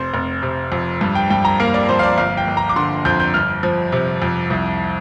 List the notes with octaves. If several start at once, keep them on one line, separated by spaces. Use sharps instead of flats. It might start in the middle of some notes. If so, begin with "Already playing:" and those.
Already playing: F1 C5
F1
C3
F2
G2
G5
G2 G5
A#5
A#3 F5
D5
F3 C5
F5
D5
G1 F5
G5
G1
A#5
D6
D3 C6
F2 G6
G6
G1 F6
F3
C3
F2
C2